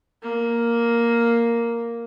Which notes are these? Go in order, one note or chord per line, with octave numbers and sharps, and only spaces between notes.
A#3